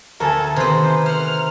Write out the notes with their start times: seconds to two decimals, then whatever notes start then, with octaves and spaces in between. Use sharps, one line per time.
0.20 D2 A3 F#4 A4 A#4 G#5 A6
0.56 C3 D#3 B3 C5
1.06 C5 F#5 F6